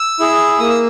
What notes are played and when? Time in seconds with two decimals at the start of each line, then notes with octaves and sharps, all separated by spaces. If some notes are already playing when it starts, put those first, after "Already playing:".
Already playing: E6
0.20 E4 G#4
0.59 A#3 D#6
0.69 E6